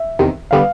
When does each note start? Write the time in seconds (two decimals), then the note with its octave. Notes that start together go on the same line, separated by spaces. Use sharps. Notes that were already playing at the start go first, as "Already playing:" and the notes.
Already playing: E5
0.19 E2 C3 D#3
0.51 D3 G3 B3 F5